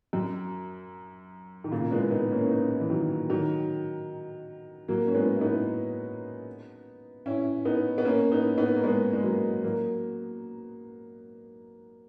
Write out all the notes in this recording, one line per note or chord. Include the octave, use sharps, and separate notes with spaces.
F#2
D#3
A#2 C#3
A#3
G#3 B3
B3 D#4
A#3 C#4
C#4
B3 D#4
E3
D#3 F#3
D#3 F#3
F#3 A#3
C#4
G#3 B3
E4
B3 D#4
C#4 E4
B3 D#4
B3
A#3 C#4
B3 D#4
B3 D#4
A#3
G#3 B3
G#3
F#3 A#3
F#3 A#3